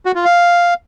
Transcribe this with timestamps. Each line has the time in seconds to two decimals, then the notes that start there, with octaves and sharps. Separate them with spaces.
0.06 F#4
0.15 F4
0.25 F5